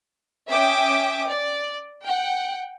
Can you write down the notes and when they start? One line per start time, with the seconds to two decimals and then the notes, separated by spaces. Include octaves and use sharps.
0.48 C#4 E5 G5 D6 D#6
1.27 D5
2.03 F#5 G5